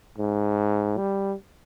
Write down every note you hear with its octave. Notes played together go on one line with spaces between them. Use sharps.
G#2
G3